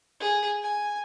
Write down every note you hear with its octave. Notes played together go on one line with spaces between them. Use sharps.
G#4
G#5